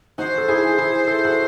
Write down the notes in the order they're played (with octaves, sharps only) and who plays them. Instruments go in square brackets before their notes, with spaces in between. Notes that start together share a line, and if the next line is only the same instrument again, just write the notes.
[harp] D#4 F#4 [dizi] C5
[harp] A4
E4 G#4
E4 G#4
A4
F#4 A4